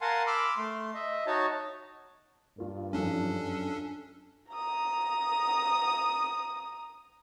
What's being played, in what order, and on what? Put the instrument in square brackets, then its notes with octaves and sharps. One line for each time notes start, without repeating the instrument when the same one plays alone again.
[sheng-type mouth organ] A#4 F5 F#5 G#5 A5 C6
B5 C6 D6 E6 F6
A3 C6
D#5 E5
D#4 F#4 C#5 A5
[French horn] G2 [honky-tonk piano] A#3 F4
[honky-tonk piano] F#2 D#3 F3 [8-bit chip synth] C#4 D4 A4
[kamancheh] A#5 D#6